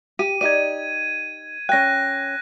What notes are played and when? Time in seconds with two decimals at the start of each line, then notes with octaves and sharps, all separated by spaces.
0.19 G4 D#7
0.41 D#4 G4 D5 G#6 D#7
1.69 C#4 G5 F#6 A#6